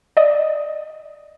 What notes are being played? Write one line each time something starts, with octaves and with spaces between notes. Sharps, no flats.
D5 D#5